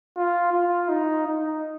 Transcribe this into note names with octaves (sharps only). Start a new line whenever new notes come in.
F4
F4
D#4
D#4